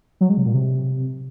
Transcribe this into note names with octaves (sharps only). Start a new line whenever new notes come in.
F#3
G#3
C3
A#2
C3